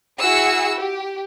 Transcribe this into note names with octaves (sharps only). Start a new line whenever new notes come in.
E4 F#4 G#4 F#5 E6 C#7
G4